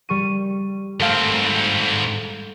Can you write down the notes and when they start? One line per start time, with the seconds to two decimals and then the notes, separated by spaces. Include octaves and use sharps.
0.09 G3 C#6 D#7
1.00 G#2 A3 C4 F5